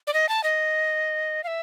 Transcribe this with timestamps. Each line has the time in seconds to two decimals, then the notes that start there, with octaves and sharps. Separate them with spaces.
0.07 D5
0.14 D#5
0.29 A5
0.44 D#5
1.44 F5
1.47 E5